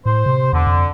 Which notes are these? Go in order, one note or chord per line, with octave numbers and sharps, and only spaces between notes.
A2 C5
C3
E2 D3
F2